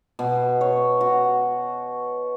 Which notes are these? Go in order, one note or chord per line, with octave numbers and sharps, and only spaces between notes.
B2
C#5
F#4